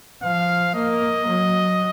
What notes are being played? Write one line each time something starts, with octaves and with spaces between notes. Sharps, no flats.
F3 F5
A#3 D#5
F#3